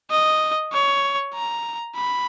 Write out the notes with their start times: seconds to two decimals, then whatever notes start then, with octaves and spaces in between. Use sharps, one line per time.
0.11 D#5
0.73 C#5
1.35 A#5
1.96 B5